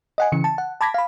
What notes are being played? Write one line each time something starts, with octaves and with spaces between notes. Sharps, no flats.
D#5 F#5 G#5
C#3 E3 C#7
A5
F#5
A5 B5 D6 G#6 A#6 B6
F5 B5